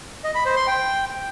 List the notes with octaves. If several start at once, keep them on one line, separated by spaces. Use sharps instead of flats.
D#5
B5
C5
C6
G5